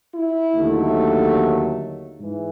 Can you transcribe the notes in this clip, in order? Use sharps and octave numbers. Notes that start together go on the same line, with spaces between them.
E4
D#2 D3 F#3 A3
G#2 E3